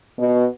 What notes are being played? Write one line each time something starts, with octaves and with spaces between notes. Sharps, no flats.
B2